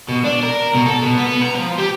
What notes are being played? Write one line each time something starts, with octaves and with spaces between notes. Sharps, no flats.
B2
D4
A#4
B2
A4
B2
B3
A#5
F3
G4